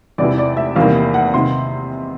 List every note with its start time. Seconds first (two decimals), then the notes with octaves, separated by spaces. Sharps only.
0.18 E2 C3 E3 D5
0.38 D5
0.57 E5
0.76 E2 C3 D#3 G3 A#3 F5
1.14 F#5
1.34 C3 D#3 C6